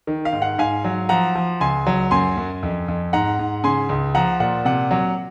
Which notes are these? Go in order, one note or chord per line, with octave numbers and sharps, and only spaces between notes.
D#3
F5
G#2
F#5
G#2 F5 G#5
F#3
F3 F#5 A#5
F3
C#2 G#5 C6
F#3
F#2 G#5 C6
F#2
F2
F2
G#2 F#5 A#5
G#2
C#3 G#5 C6
C#2
F3 F#5 A#5
A#2 F#5
C3 F#5
F#3